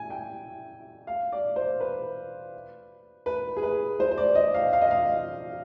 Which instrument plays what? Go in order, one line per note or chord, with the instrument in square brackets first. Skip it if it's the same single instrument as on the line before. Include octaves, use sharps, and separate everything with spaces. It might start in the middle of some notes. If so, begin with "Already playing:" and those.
Already playing: [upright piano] G#5
G5
F5
D5
C5
B4
B4
G#4
B4
C5
C5
D5
D#5
F5
F5
D#5
F5